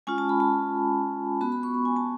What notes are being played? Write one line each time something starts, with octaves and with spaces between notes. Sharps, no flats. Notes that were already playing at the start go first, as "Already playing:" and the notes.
G#3 C#4 F4 G#5
A5
B5
A5
B3 F#4 B5
B5
C#6
B5
G#5
A5